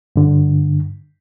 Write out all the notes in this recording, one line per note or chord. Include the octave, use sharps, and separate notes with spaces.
G2 D3